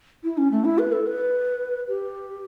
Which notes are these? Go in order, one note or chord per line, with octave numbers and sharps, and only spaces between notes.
E4
C#4
A3
E4
B4
A4
B4
G4